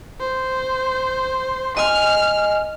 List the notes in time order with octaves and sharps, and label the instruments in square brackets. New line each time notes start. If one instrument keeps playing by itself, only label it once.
[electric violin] C5
[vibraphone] D#5 G#5 [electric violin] F6